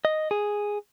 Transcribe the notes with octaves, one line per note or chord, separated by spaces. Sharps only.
D#5
G#4